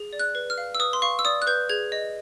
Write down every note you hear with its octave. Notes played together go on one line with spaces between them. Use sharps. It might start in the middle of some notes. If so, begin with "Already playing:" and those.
Already playing: G#4
D5
F#6
B4
F6
F5
E6
B4 D#6
C6
F5 C#6
E6
D5 D#6
F#6
B4 G6
G#4 G#6
D#5